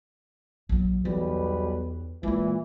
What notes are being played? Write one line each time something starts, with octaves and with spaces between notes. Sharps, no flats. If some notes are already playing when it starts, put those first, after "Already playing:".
A#1 F#3
B1 E2 G3 B3 B4
A#2 E3 G#3 A#3